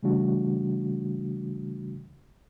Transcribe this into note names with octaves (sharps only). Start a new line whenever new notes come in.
C#3 E3 G3 A3 D4 F#4